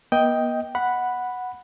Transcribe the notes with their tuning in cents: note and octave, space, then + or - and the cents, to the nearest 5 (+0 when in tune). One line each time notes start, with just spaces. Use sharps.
B3 -45 D#5 +15 G5 +0
F#5 -5 B5 +0